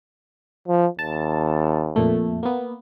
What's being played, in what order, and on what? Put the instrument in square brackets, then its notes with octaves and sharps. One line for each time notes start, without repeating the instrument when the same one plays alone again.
[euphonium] F3
[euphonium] D#2 [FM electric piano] A5
[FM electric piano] F2 A#2 A3
A#3 B3